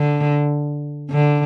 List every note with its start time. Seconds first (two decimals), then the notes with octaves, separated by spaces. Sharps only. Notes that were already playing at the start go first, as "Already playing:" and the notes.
Already playing: D3
1.10 D3